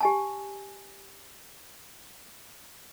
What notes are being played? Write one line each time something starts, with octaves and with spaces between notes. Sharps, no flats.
G4 G#5 A5